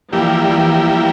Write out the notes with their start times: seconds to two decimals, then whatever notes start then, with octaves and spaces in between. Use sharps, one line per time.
0.12 E3 F3 G3 A#3 E4 G4
0.46 E3 G3